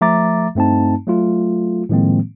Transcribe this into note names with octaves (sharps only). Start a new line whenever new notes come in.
F3 A3 E5 A#5 D6 A6
G2 A3 C4 D#4 A5
F#3 A3 F4
A2 D#3 F3 G#3 A#3 C4